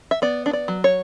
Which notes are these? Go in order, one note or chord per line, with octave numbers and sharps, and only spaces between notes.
E5
B3 D5
D4
D5
F#3
C#5